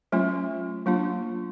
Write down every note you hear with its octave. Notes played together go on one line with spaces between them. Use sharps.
F#3 A3 C#4 F4
F#3 A#3 D4 F4